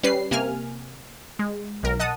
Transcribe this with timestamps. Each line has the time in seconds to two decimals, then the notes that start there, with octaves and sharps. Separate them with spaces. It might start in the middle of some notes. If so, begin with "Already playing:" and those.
0.03 G3 C#4 B4 C7
0.31 C3 A#3 G#5 F6
1.39 G#3
1.83 B1 A#4
2.00 D#5 F#5 A5 D#6